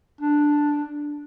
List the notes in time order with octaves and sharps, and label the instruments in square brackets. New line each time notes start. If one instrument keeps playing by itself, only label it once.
[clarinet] D4